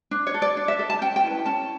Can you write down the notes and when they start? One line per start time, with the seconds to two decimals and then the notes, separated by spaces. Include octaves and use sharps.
0.11 D4
0.27 C#5
0.34 A4
0.42 D5
0.57 D4
0.68 E5
0.79 A4
0.90 A5
1.01 C#4 G5
1.16 G5
1.24 E4 B4
1.46 C#4 A5